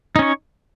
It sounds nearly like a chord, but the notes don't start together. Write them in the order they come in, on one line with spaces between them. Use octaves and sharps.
D#4 C#4 C#5